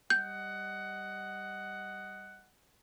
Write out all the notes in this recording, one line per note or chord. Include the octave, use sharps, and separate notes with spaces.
G3 D#5 F#5 G6